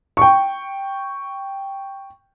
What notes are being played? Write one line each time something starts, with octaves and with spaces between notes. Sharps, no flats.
G5 C#6